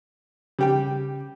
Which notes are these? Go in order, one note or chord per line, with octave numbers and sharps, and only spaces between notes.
C#3 G3 G4 G5